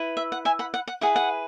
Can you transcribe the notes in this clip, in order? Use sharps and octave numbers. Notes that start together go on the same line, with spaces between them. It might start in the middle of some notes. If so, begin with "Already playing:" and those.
Already playing: E4 B4
E5
F#5
E5 G#5
F#5 B5
F#5
F#5
E4 G#4 B4 F#5
F#5